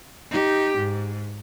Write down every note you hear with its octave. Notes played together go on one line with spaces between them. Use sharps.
D#4 G4
G#2